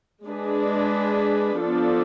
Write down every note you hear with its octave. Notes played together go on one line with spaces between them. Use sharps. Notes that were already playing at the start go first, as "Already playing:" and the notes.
G#3 D4 G#4 B4
F3 B3 D4 A4